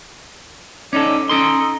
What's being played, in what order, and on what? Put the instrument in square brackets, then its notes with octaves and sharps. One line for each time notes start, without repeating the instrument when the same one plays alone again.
[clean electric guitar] C#4 D#4 A4 [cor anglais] D5
[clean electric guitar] C#4 A4 C6 [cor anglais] D#4